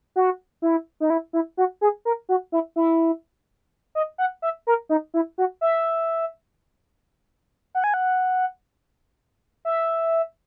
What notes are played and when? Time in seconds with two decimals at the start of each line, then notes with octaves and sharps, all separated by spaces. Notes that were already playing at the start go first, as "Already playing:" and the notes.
0.16 F#4
0.62 E4
1.00 D#4
1.10 E4
1.33 E4
1.57 F#4
1.81 G#4
2.05 A#4
2.29 F#4
2.52 E4
2.76 E4
3.95 D#5
4.18 F#5
4.42 E5
4.67 A#4
4.89 D#4
5.14 E4
5.38 F#4
5.61 E5
7.75 F#5
7.84 G#5
7.94 F#5
9.65 E5